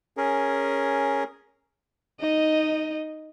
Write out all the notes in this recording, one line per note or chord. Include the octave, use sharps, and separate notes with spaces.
C#4 G#4 A#4
D#4 D#5